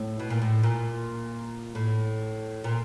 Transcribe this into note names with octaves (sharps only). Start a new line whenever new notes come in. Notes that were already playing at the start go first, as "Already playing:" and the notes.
Already playing: A2
B2
A#2
A2
A#2
A2
A#2